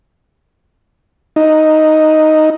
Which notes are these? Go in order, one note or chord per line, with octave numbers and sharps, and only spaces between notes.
D#4